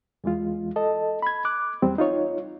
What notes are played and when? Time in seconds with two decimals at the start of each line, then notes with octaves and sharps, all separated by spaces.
0.24 E2 E3 G#3 F4
0.76 A4 D#5 A5
1.22 B5 G#6
1.45 D6 F#6
1.82 E2 G3 C4
1.98 D#4 F4 C#5